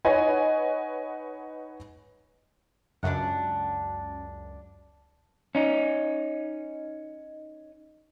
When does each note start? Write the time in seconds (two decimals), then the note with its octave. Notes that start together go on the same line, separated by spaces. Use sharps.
0.05 D#4 B4 C#5 D#5 F#5 G#5
3.03 C#2 F#2 D4 F#5
5.55 C#4 D#4